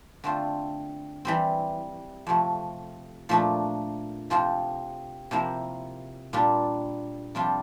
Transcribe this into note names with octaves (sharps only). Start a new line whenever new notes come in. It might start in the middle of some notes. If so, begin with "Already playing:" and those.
D3 A3 C4 F4
E3 G3 C4
F2 C3 F3 A3
A#2 F3 A3 D4
F2 C3 F3 C4 F4
C3 F3 A#3 E4
A#2 G3 D4 F4
F2 C3 G3 D4 F4